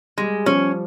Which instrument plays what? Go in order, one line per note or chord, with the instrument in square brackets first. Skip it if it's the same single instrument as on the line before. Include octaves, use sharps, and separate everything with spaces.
[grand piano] G3 [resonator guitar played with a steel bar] G#3
[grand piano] F3 [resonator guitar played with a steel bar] C#4